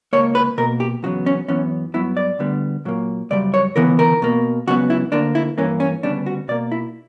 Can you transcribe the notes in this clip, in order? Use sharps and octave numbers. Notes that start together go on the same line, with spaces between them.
C#2 B2 A#3 C#5
B4
B2 A#3 A#4
G4
E2 C#3 F#3 B3 F#4
C#4
F#2 E3 B3 C#4
G2 F#3 B3 E4
D5
D2 D3 G3 B3
A#2 F#3 A#3
F#2 C#3 G3 D5
C#5
D2 C#3 E3 B3 A#4
A#4
B2 A#3
C#2 C#3 F#3 B3 F#4
E4
D2 D3 A#3 D4
E4
G2 E3 A#3 C#4
C#4
D2 C#3 G3 B3 D4
F#4
B2 A#3 D5
E4